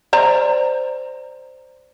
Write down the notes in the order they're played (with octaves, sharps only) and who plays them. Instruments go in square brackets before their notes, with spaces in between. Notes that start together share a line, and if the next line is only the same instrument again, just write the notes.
[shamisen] C5 D5 A#5